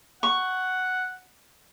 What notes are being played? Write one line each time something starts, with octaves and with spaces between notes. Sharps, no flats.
F#5 C#6